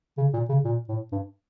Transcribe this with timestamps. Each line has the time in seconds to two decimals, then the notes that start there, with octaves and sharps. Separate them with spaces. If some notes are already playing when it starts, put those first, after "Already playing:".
0.17 C#3
0.33 A#2
0.49 C#3
0.64 A#2
0.89 A2
1.12 G2